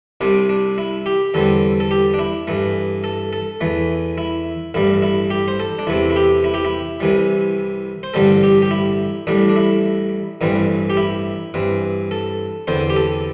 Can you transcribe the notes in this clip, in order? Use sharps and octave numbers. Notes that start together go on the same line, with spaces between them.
C2 C3 G3 C4 D4
D4
E4
G4
E2 D3 G3 C4 A4
A4
G4
D4
E4
G2 E3 A3
A4
A4
E2 E3 A3
E4
A1 G2 G3 E4
E4
G4
C5
A4
D4
E2 C3 A3 C4 E4
E4
G4
E4
G4
E4
C2 C3 E3 G3
C5
A1 G2 D3 G3 C4 A4
G4
G4
E4
A1 A2 G3 D4
D4
E4
A1 G2 E3 G3 C4
G4
E4
G2 E3 C4
A4
E2 D3 C4 C5
G4
A4